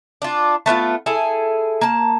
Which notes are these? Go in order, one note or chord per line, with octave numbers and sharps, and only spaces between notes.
D4 F4
A3 B3 C#4 F4
E4 G#4 A4
A#3 A5